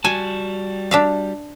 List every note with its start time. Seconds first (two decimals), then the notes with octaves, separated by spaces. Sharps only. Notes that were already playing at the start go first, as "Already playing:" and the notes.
0.05 G3 F#4 G#5 A5
0.91 D4 E5 F5